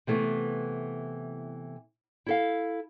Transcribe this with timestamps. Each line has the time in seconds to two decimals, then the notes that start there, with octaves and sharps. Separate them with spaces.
0.07 C3 E3 A3 B3
2.26 E4 A4 F5